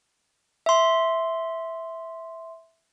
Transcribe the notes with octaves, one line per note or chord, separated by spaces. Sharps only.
E5 C6